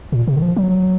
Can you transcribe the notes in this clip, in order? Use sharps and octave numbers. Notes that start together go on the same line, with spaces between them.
A#2
C3
D#3
F3
F#3